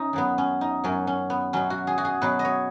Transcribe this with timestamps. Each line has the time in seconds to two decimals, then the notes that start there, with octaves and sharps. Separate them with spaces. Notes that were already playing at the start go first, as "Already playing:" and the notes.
Already playing: C#4 D#4
0.13 F#2 F#3 B3
0.38 C#4
0.61 D#4
0.84 F#2 F#3 C#4
1.07 C#4
1.30 B3
1.53 B2 F#3 C#4
1.70 F#4
1.87 G#4
1.98 F#4
2.05 G#4
2.22 B2 F#3 B4
2.39 D#5
2.45 C#5